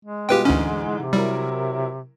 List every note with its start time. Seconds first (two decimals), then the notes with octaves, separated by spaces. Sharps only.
0.05 G#3
0.29 B2 G3 F4 G4 B4 G5
0.45 D2 G#2 D3 E3 C#4
0.99 C3
1.13 F#3 G3 E4 A#4